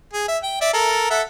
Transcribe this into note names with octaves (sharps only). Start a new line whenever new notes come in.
G#4
E5
G5
D5 E5
A4 A#4
A4 E5 F#5